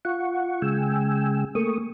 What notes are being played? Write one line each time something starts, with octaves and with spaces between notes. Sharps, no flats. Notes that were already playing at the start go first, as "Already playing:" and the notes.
F4 F#5 C#6
C#3 G#3 G5 G#5 E6
A3 A#3 C#6 D#6